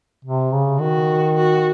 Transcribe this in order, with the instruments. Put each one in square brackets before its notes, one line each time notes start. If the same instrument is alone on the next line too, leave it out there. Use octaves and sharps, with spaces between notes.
[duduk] C3
C#3
[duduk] D#3 [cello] F#4
[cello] F#4